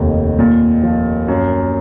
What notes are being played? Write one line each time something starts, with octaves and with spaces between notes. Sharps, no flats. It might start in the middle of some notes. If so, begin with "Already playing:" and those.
Already playing: F1 D#2
A#2
F3
F#2